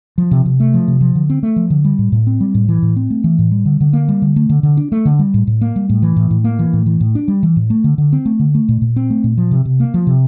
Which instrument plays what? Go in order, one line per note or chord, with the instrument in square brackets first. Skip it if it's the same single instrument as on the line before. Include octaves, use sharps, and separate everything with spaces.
[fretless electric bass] F3
C3
C3
A3
F3
C3
F3
D3
C4
A3
F3
D3
G3
A2
A2
C4
G3
A2
E3
A2
C4
A3
E3
A2
G3
D3
D3
A#3
G3
D3
A3
D3
D3
D4
A3
D3
G3
A2
A2
A#3
G3
A2
E3
A2
A2
A#3
E3
A2
E3
A2
D4
G3
E3
A2
A3
D3
D3
C4
A3
D3
A3
A#2
A#2
C4
A3
A#2
F3
C3
C3
A#3
F3
C3